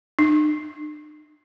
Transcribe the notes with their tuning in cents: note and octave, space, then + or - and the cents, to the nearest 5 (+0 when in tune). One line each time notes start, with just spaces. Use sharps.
D#4 -45